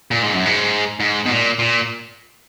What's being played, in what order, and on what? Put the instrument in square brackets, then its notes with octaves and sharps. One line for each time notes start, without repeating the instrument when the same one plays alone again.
[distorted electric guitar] A#2
G#2
F#2
G#2
G#2
B2
A#2
A#2